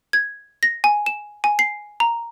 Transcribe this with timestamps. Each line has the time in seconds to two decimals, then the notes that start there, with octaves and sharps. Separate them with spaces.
0.13 G#6
0.63 A#6
0.84 G#5
1.06 E7
1.44 G#5
1.59 C7
2.00 A#5